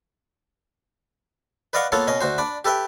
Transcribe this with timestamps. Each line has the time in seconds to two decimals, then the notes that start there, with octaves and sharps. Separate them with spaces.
1.73 B4 D5 D#5 F5 F#5 C#6
1.92 A#3 B3 F4 A4 C#5
2.07 B2 C#4 D#5
2.21 D2 F#4 C5
2.38 D4 D5 B5
2.65 G4 A4 B4 E5 G5